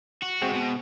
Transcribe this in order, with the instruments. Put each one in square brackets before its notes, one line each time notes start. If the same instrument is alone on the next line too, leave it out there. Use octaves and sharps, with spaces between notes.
[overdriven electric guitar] F#4
[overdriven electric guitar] C3 [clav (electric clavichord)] G#3 C4 F#4
[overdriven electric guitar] B2